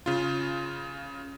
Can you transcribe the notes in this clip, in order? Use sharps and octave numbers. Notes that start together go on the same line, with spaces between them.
C#3 F4